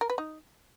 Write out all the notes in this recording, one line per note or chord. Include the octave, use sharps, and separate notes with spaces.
A#4
B4
D#4